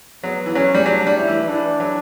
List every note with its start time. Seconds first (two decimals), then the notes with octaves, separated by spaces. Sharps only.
0.24 F#3 B3
0.46 E3
0.55 F#3 C#4
0.75 G3
0.86 F#3 D4
1.07 G3
1.18 E4
1.28 E3
1.48 E3 D4
1.80 F#3